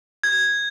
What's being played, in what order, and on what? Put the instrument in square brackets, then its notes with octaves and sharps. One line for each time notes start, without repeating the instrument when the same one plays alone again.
[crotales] G#6